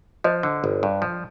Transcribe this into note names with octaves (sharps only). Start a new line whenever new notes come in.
F3 C5 D#5
D3
G1
G2
F3